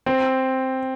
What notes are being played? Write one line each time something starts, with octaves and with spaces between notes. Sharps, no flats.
C4